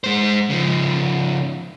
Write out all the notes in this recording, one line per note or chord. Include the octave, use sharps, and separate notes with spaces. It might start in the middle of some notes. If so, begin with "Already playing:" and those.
G#3 C5
C#3 F3